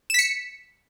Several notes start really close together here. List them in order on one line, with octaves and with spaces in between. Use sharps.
E7 B6 C#7